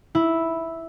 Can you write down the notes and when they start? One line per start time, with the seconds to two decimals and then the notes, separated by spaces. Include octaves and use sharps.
0.15 E4